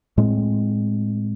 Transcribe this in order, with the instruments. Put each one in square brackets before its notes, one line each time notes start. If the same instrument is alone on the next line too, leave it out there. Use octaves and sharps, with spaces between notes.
[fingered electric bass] A2 G#3 C4